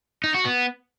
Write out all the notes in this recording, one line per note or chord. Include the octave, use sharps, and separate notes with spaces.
D#4
F#4
B3